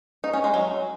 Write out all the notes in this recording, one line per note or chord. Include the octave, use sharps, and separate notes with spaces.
D#4
C#4
G#3
F#3